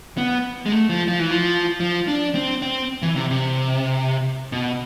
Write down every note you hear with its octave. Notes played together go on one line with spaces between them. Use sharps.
B3
G#3
A3
F3
F3
E3
F3
F3
D4
C4
C4
E3
C3
C3
B2